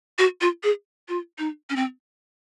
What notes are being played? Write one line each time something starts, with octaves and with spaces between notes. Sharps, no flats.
F#4
F4
G#4
F4
D#4
C#4
C4